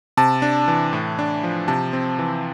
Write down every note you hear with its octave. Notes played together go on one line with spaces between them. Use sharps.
C3 A5
D4
E3
A2
D4
F3
C3 A5
C4
E3